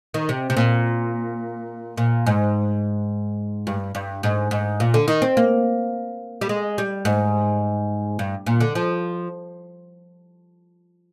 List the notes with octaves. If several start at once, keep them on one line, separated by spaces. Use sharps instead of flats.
D#3
C3
C3
A#2
A#2
G#2
G2
G2
G#2
G#2
A#2
D3
D#3
C4
A#3
G3
G#3
G3
G#2
G2
A#2
D3
F3